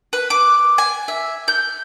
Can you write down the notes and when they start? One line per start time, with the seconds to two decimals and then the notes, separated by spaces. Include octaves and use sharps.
0.13 B4
0.30 D6
0.78 G#5
1.08 E5
1.48 G6